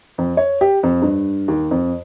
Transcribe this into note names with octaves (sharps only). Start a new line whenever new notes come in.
F2
C#5
G4
F2
G2
D#2
F2